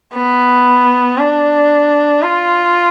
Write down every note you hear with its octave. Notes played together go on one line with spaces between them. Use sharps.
B3
D4
F4